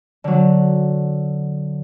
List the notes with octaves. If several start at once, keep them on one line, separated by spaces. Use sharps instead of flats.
D3 F#3